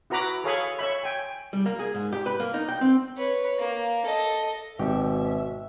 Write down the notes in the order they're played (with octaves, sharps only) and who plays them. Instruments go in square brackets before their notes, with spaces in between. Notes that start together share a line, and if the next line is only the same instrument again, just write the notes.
[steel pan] E4 F#4 B4 A#5 B5 D6
G#4 A4 C#5 F5 G#5 B5
C#5 E5 B5
G5 G#5
[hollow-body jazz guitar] G3
A#3
G#4
G#2
G4
B4
A#3
D#4
G5
C4
[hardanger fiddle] B4 C#5
A#3
A4 D#5
[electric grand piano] G#1 [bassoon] B2 [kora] G4 [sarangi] E5